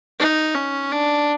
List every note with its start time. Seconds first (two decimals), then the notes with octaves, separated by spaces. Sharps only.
0.19 D#4
0.55 C#4
0.91 D4